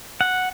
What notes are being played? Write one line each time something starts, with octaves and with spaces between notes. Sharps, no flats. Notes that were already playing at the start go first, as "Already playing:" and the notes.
F#5